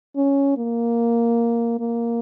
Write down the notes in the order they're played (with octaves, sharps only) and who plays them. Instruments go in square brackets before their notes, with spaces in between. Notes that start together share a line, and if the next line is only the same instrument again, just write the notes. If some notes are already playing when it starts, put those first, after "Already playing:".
[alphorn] C#4
A#3
A#3